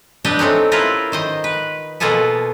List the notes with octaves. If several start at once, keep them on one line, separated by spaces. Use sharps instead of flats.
D4 G4 B4 D#5 G5
A3 C4 C#4 D#4
E4 F4 A#4 B4
D#3 C5 D#5
B4
B2 A#3 F4 G#4 A4 B4